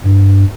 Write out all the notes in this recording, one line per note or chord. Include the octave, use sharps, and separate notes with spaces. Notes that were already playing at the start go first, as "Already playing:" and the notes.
G2